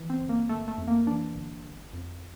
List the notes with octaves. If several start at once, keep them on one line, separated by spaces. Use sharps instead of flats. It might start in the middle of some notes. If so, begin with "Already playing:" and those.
Already playing: E3
C4
G1
A#3
G1 A3
A3
F2
A#3
E3 D4
G1
G1
F2